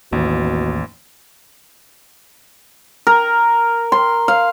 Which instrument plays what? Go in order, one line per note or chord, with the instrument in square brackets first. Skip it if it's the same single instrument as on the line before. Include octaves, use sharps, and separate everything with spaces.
[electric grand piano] A1 [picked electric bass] D#2 [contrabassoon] B2
[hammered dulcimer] A#4
C6
F5